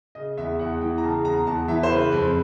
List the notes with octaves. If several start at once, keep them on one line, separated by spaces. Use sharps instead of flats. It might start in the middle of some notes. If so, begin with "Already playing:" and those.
C#3 D#5
E2 E5
E2 F#5
E3 G5
A#5
C#3 A5
E2 A#5
E2 A5
E3 E5
C5
C#3 B4
F2